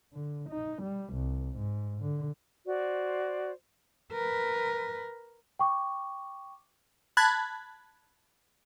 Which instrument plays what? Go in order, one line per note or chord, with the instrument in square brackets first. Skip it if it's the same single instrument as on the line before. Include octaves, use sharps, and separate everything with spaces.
[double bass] D3
D#4
G3
C2
G#2
D3
[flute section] F#4 C5 D5
[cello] A#4 B4
[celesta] G5 C#6 D6
[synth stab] A5 B5 F#6 G#6